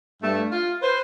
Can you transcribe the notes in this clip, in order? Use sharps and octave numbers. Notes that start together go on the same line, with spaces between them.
G2 A3
F4
B4 C5